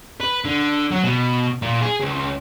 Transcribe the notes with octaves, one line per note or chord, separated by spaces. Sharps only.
B4
D3
F#3
B2
A#2
G#4
C#2